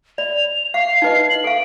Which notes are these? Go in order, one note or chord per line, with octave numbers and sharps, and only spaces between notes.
D5 F7
F5 C7
D#4 B4 D#5
F#7
A4 F5 D7